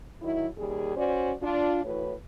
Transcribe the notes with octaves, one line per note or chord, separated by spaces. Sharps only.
D#3 F#3 E4
D#2 G3 G#4
C#4 F#4 C5 D5
D4 F4
A2 E3 F#4 B4 C#5